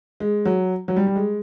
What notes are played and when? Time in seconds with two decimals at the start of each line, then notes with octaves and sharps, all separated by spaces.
0.20 G#3
0.45 F#3
0.88 F#3
0.96 G3
1.07 G3
1.16 G#3